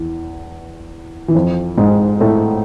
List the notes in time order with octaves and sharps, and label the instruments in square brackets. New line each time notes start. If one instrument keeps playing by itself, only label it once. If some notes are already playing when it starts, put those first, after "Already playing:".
Already playing: [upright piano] E2 E3
E3
F2 F3
G#2 G#3
A2 A3